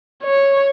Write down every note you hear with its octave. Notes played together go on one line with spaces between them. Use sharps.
C#5